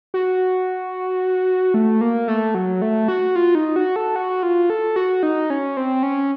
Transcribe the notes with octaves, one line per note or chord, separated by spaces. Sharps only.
F#4
A3
A#3
A3
F#3
A3
F#4
F4
D#4
F#4
A4
F#4
F4
A4
F#4
D#4
C#4
C4
C#4